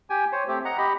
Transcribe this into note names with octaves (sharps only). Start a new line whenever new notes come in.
G4 G5 G#5
C5 C#5
A3 C4 G4
D#5 F#5 A#5
G4 D#5 B5